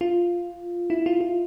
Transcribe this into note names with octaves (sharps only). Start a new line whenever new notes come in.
F4
E4
F4
F4